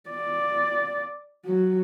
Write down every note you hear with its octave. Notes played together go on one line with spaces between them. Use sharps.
D5
F#3